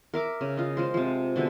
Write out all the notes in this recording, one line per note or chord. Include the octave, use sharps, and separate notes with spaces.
A#4 E5 D6
C#3
F4 D#5
G#3 F4 C5
C3 F3
B2 D3 G#3 E5